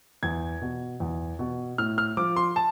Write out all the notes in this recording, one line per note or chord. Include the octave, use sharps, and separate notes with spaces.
E2 G#6
B2
E2
B2
A2 F6
F6
F3 D6
C6
A5